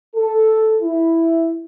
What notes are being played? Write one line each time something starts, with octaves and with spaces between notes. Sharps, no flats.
A4
E4